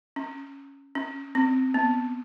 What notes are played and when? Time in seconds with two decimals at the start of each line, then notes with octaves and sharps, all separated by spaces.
0.16 C#4
0.95 C#4
1.35 C4
1.74 B3